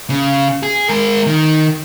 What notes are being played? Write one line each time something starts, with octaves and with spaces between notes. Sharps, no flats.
C#3
G#4
G#3 A#4
D#3